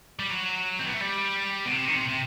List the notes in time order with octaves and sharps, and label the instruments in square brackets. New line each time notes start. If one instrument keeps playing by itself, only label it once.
[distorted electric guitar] G3
F#3
C4
B3
A3
G3
B2
C3
D#3
C3
C3